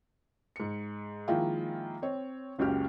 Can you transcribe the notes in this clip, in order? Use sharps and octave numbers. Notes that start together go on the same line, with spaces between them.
G#2 C#7
D#3 F3 G#3 A#3 E4 F4
C4 C#5
F#1 C#2 C#3 F#4 G4 F6